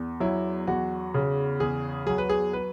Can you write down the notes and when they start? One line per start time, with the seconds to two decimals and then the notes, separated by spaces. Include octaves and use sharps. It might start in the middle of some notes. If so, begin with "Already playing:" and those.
Already playing: E2
0.20 F#3 E4
0.67 E2 F#4
1.14 C#3
1.60 E2 G#4
2.06 F#3 G#4
2.18 B4
2.29 G#4
2.53 B4